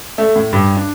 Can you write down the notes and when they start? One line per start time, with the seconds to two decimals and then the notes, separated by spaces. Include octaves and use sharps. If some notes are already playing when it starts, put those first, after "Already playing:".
0.18 A3
0.36 A2
0.53 G2
0.77 D4